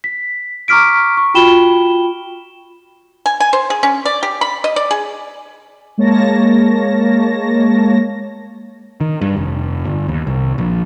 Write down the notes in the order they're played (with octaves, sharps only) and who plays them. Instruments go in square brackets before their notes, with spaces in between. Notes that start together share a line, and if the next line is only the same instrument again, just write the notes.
[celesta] B6
A#5 C#6 D6 F6 B6 D7
C#6
F4 F#4 G5 B5 E7 G7
[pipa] G#5
G#5
C5
G#4
C#4
D5
G4
B5
D#5
D5
G#4
[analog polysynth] G#3 A#3 C#5 A5 A#6
[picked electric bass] D#3
G2
F1
G1
D#2
C2
A#1